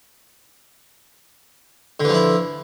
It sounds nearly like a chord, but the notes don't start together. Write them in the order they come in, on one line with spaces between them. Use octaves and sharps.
D3 E3 F3 E4